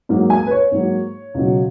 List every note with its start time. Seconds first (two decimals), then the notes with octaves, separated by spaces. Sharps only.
0.09 G#2 F#3 A#3
0.30 G#5
0.47 B4
0.51 C#5
0.72 G#2 F#3 A#3
1.34 C#2 B2 F#3